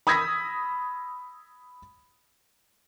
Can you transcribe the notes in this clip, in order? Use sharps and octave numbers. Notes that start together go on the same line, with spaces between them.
B5 D#6 E6 G#6 A#6 B6